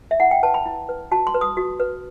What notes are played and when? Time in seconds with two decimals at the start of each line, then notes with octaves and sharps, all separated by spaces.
0.11 E5
0.20 E4 F#5
0.31 G5
0.43 B4 A5
0.54 B5
0.66 E4
0.89 B4
1.11 F#4 A5
1.27 C6
1.34 B4
1.41 D#6
1.57 F#4
1.80 B4